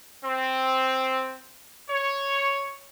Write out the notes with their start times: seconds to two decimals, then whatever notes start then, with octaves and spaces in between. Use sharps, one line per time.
0.24 C4
1.89 C#5